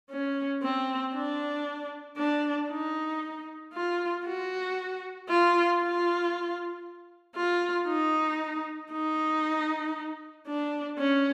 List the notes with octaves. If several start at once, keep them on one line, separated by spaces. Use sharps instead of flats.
C#4
C4
D4
D4
D#4
F4
F#4
F4
F4
F4
D#4
D#4
D4
C#4